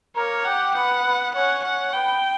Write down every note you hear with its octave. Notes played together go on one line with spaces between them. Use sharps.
A#3 A#4 C#5
G4 F#5 G5
B3 B4 F#5
B3 B4
C#4 C#5 F#5
C#4 C#5 F#5
B3 B4 G5